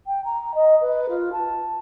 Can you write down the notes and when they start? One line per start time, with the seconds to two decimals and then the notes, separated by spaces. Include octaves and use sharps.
0.07 G5
0.24 A#5
0.54 D#5
0.81 B4
1.09 F4
1.32 A5